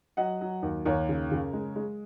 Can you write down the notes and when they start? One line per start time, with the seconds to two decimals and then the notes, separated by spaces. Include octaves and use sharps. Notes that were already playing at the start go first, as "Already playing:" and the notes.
0.17 F#3 D#5 F#5
0.41 F#3
0.62 D#2
0.85 D#2 A#4 C#5
1.09 C#3
1.31 C#3
1.53 G#3
1.76 G#3